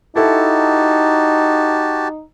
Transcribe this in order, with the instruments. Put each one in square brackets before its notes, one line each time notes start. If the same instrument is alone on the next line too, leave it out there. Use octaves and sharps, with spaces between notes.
[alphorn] D#4 [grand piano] E4 A4 [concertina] F#4 G4 A5